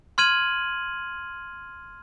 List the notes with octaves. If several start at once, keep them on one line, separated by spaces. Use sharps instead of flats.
C6 F6 G#6 D#7 F#7